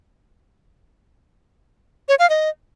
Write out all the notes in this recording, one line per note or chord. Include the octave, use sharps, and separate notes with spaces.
C#5
F5
D#5